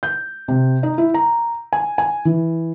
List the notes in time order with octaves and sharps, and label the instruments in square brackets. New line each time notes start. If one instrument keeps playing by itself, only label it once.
[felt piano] G6
C3
D#4
E4
A#5
G#5
G#5
E3